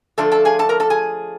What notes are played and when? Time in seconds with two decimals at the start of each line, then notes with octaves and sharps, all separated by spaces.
0.18 D3 F3 A3 D4 F4 A4 A5
0.32 A4 A5
0.45 G#4 G#5
0.59 A4 A5
0.69 A#4 A#5
0.80 A4 A5
0.90 G#4 G#5